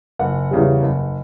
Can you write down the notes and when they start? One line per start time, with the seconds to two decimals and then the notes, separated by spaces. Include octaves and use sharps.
0.19 F#1 F#5
0.51 E2 C#3 G3
0.82 F#1